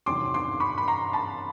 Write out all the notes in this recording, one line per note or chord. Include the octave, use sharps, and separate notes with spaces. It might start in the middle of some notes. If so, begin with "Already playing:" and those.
E2 C3 D#3 F#3 C6 D6
C6 D6
B5 C#6
B5
A#5 C6
A5 B5